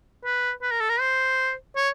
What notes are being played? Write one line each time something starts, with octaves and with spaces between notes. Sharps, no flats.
B4
B4
A#4
A4
A#4
C5
C#5